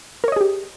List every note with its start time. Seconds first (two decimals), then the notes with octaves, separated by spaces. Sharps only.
0.24 A#4
0.28 C#5
0.32 D#5
0.36 G#4
0.41 G4